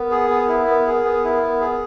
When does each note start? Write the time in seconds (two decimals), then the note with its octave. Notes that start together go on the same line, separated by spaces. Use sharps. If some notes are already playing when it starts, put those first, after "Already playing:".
Already playing: B3 A#4
0.11 G#4
0.30 B3
0.48 E4
0.67 B3
0.87 G#4
1.04 B3
1.24 E4
1.42 B3
1.61 G#4